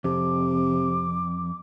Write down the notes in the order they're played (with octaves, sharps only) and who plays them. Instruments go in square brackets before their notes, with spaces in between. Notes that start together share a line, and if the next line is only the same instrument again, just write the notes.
[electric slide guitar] F2 [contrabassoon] C3 [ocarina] D6